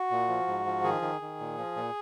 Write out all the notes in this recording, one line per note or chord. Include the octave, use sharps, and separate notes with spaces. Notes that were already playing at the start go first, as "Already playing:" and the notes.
Already playing: F#4
A#2
F3
G#2
F3
D#3 G#4
D#3
D#3
A#2
F3
A#2